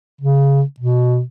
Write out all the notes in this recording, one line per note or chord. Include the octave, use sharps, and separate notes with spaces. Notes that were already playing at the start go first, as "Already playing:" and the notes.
C#3
B2